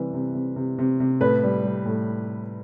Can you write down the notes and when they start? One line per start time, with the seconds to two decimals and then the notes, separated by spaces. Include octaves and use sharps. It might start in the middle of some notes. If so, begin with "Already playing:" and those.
Already playing: C3 E3 G3 B4
0.14 C3
0.35 C3
0.56 C3
0.78 C3
1.00 C3
1.21 A2 B4
1.43 G3
1.63 G3
1.86 A2